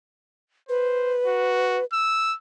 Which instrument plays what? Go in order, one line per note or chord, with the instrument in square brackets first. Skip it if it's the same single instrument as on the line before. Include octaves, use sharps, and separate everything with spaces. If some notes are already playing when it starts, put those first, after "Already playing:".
[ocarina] B4 [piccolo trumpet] C5
[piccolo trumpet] F#4
E6